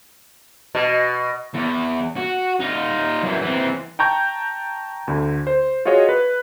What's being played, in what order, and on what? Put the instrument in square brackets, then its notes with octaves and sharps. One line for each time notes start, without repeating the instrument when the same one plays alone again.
[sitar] B2
[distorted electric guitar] E2
F#4
D#4 F4
F#2 E3
E3 C4
[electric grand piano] G5 A5 A#5 C#6 G6
D2 D3
C5
F4 F#4 G#4 C#5 D#5
B4